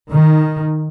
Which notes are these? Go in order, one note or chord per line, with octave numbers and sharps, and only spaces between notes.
D#3